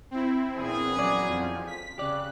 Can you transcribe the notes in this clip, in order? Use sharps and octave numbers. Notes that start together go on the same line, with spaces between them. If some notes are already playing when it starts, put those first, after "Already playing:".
C4 E4
A#1 E2 G#4
F#3 C#4 D5
F2 F3
B6
C#3 G4 D5 F#6